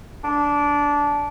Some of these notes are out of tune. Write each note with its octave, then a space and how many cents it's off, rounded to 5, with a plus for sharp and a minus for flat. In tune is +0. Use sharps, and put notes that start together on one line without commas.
D4 -15